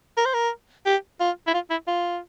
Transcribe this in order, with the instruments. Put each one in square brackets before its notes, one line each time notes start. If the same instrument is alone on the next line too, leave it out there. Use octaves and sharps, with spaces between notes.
[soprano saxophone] A#4
C5
A#4
G4
F4
E4
F4
E4
F4